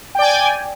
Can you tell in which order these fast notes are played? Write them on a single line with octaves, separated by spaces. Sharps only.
G5 D5 G#5